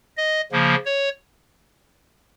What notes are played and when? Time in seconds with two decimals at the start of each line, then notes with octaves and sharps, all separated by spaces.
0.17 D#5
0.52 C#3 F3 A#3
0.85 C#5